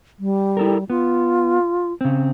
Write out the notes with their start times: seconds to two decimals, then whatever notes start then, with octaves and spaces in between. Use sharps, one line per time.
0.19 G3
0.57 E4 A4 A#4
0.90 B3 F4
2.01 C#3 C4